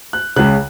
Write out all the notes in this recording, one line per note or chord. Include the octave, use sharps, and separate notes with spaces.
F#6
C#2 C#3 F#6